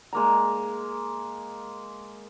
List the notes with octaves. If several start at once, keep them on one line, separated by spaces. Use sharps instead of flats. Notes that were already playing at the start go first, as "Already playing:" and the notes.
G#3 A#3 A#5